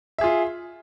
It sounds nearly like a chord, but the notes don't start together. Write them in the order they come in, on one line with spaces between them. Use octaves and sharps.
E5 G#4 F4